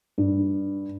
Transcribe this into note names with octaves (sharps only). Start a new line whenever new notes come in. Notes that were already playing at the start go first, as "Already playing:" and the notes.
G2